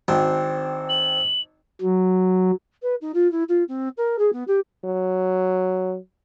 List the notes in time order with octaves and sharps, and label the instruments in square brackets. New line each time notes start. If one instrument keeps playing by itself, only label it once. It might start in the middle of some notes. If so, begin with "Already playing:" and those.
[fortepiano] G#1 [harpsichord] C4 D4
[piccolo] F#7
[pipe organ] F#3
[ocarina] B4
D#4
F4
E4
F4
C4
A#4
G#4
B3
G4
[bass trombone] F#3